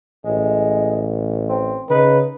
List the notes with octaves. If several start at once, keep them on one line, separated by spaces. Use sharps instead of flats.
A1 G#3
C4
C#3 D#4 B4